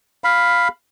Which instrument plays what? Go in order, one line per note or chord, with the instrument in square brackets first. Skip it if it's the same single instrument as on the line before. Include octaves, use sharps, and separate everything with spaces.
[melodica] F5 B5